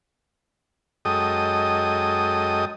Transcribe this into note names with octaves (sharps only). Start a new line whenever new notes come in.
F#2 G#3 A4 D#5 G5 D#6